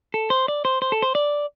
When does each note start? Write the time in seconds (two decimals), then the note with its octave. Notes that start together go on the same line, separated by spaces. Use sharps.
0.14 A4
0.30 C5
0.48 D5
0.65 C5
0.82 C5
0.92 A4
1.02 C5
1.15 D5